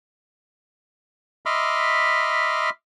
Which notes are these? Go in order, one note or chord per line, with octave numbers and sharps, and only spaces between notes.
D#5 E5 B5 C6 D6 F6